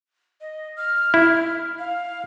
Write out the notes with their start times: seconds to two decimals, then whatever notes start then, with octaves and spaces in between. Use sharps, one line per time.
0.41 D#5
0.77 F6
1.14 E4
1.79 F5